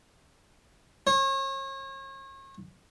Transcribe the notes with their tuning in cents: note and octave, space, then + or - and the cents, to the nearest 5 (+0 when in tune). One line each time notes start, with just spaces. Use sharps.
C#5 -40